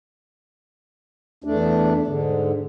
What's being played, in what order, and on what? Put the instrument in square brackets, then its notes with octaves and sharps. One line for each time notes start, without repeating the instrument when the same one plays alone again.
[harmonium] E2 A3 D4
G#2 D3